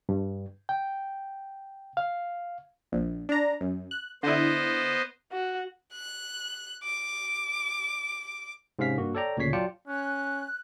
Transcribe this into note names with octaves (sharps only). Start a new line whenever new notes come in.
G2
G5
F5
A#1
D4 A#5
F#2
F#6
D3 B3 E4 C5 D#5
F#4
F#6
D6
G#2 C3 C#4 F5 B6
G2 A#3 F#4
A4 C#5 D5 G5 A#5
D2 A#2 C#3 C#5 B6 C7
F#3 F4 D5 G5 A5 C#7
C#4 F#6